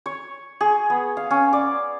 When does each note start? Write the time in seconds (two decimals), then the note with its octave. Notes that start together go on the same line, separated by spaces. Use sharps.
0.06 C#5
0.61 G#4
0.90 B3
1.17 F5
1.30 C#4
1.53 D5